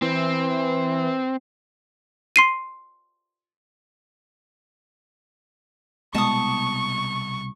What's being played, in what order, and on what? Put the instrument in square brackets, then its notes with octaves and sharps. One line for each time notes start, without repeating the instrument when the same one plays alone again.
[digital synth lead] E3 [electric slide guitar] C4
[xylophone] C6 C7 D#7
[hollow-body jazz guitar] C2 B2 D#5 [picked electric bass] G#3 [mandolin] A5 D#6 [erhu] C#6